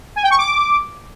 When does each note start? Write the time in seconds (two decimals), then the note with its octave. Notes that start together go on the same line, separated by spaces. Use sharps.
0.16 G#5
0.23 G5
0.31 C#6
0.38 D6